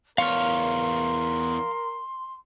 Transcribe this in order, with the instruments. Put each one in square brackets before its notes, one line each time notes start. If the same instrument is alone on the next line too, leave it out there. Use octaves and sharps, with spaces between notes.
[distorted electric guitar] E2 C#5 [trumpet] A#4 [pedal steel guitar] F5 F6 [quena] C6